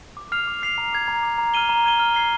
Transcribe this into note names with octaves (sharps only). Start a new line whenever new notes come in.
D6
F6 C7 F7
D6
F6 C7 F7
A#5
D6 G#6
A#5
D6 G#6
A#5
F6 G#6 D#7 G7
A#5
F6 G#6 D#7 G7
F6
G#6 C7 G7